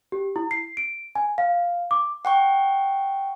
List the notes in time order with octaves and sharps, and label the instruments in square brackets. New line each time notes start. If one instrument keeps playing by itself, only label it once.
[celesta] G4
E4
C7
D7
G#5
F5
D6
[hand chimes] F#5 G5 C#6